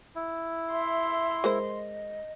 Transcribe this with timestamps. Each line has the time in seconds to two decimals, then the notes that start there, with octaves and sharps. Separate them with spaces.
0.15 E4
0.72 E5 C6
1.44 G#3 A#4 C5 D#5